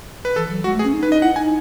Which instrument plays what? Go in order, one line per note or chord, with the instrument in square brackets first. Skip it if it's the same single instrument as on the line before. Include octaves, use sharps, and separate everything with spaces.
[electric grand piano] B4
[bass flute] E3 [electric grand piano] A4
[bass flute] F#3
[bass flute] G#3 [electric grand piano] F#4
[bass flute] A3
[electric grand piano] G#4
[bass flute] C#4
D#4
[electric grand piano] B4
[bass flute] D#4 [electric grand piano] D#5
[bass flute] E4 [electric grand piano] F#5
[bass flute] D#4 [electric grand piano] G#5